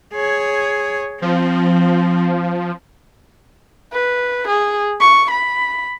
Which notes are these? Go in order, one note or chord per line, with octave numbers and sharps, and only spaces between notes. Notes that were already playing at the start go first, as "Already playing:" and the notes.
G#4 C#5
F3 C4
B4
G#4
C#6
B5